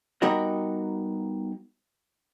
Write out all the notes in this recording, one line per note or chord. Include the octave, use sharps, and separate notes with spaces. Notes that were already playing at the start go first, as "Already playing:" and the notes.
G3 B3 D#4 F#4 A#4 D#5